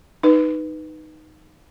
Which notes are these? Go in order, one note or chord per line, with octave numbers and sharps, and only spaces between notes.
D#4 B4